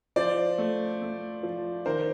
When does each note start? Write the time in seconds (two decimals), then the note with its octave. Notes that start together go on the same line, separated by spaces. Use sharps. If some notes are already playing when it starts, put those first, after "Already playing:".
0.16 F3 C5 D5
0.58 A3
1.02 A3
1.43 F3
1.86 D#3 A#4 C5